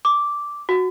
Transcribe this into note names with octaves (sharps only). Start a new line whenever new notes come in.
D6
F#4